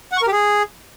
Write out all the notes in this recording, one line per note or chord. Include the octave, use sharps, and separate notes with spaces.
F#5
C#6
A#4
G4
G#4